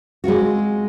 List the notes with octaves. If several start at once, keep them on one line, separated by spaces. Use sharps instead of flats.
G#3 C4 F4 F#4